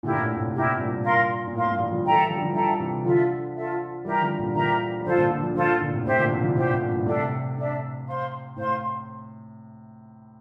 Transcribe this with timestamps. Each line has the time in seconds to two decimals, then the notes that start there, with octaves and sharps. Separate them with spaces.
0.03 A#2 D3 E4 G4 A#4
0.14 A#2
0.21 A2
0.37 A2 C3
0.54 A#2 E4 G4 A#4
0.66 C3
0.79 G2 A#2
1.04 A#4 F5 C6
1.48 A#2
1.54 A2 A#4 F5 C6
1.66 G2 A#2
1.79 E3 G3
1.91 D3 F3
2.05 E3 G3 A4 E5 G5 A#5
2.16 E3 G3
2.30 D3 F3
2.37 G3
2.41 D3 F3
2.54 D3 F3 A4 E5 G5 A#5
2.79 C3 E3
3.05 D3 F3 F4 A4 E5
3.55 F4 A4 E5
4.05 E3 G3 G4 A#4 E5 A#5
4.22 D3 F3
4.39 A#2 D3
4.55 D3 F3 G4 A#4 E5 A#5
5.00 G3
5.05 D3 F3 F4 A4 C5
5.18 A#2 D3
5.30 A#2 D3
5.43 D3 F3
5.55 D3 F3 F4 A4 C5
5.81 A#2 D3
5.93 A2 C3
6.05 A2 C3 G4 C5 E5
6.18 A#2 D3
6.30 C3 E3
6.43 D3 F3
6.56 C3 E3 G4 C5 E5
6.73 A2 C3
6.89 G2 A#2
7.06 A2 C3 D4 A4 E5
7.56 D4 A4 E5
8.06 C5 F5 C6
8.56 A2 C5 F5 C6